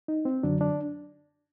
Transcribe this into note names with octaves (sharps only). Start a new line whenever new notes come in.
D#4
C4
F#2 D3 F#3 D4
D4